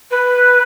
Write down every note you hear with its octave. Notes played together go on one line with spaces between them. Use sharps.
B4